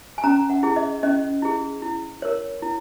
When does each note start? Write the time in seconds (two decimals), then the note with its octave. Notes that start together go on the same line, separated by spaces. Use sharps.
0.18 G#5
0.24 C#4 A#5
0.50 F#5
0.63 E4 G#4
0.76 D#5
1.03 C#4 D#5
1.42 E4 G#4
1.82 E4
2.22 A#4 C#5
2.62 E4